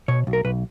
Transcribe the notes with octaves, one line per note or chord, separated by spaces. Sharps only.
B2 C#5
B1
A#4
B1 B4